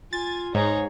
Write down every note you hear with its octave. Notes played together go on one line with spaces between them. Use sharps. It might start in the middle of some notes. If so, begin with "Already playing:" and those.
F4 G#5 A6
G#2 D#4 G#4 C#5